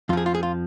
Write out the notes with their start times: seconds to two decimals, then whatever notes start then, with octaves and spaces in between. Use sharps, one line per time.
0.09 F2 F4
0.13 F3 G#4
0.26 F4
0.35 G#4
0.43 F4